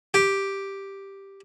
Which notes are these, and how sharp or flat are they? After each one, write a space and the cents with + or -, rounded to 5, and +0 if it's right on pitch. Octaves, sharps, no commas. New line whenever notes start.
G4 +0